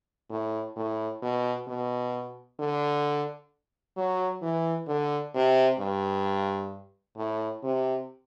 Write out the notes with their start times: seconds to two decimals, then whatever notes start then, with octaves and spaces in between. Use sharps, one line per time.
0.30 A2
0.76 A2
1.22 B2
1.67 B2
2.59 D3
3.97 F#3
4.42 E3
4.88 D3
5.35 C3
5.80 G2
7.17 A2
7.64 C3